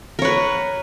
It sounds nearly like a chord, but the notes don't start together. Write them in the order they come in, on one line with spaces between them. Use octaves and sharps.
A#4 C#5 B4